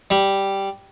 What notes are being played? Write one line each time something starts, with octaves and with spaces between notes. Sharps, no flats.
G3